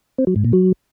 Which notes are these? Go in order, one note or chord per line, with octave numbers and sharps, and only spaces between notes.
C4
F#3
G#2
A#2
F#3